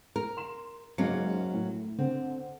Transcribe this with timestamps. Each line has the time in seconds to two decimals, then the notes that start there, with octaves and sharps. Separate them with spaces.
0.16 A#4
0.37 C6 E7
0.98 F#1 G#2 F#3 A#3 C#4 C#7
1.54 A2
1.99 D3 C4